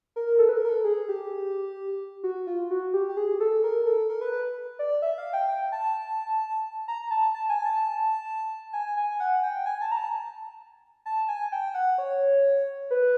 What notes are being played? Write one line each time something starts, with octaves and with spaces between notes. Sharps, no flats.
A#4
A4
B4
A#4
A#4
A4
G#4
G4
F#4
F4
F#4
G4
G4
G#4
A4
A#4
A4
A#4
B4
B4
D5
E5
F5
G5
G5
A5
A#5
A5
A5
G#5
A5
G#5
G#5
F#5
G5
G#5
A5
A#5
A5
A5
G#5
G5
F#5
C#5
B4